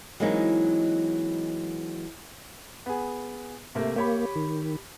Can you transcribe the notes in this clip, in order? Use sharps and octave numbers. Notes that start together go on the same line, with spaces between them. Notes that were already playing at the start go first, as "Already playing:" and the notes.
E3 F#3 G#3 A#3 C4 D#4
B3 G#4
C3 A3 A#3
A#3 G4 C#5 B5
D#3